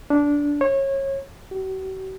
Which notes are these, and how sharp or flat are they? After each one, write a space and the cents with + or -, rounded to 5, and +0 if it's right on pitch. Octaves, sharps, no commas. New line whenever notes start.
D4 -15
C#5 -25
F#4 +45